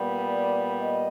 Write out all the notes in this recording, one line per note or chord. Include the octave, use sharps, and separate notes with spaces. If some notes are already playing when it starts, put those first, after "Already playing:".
Already playing: A#2 G3 B3
D5
D#5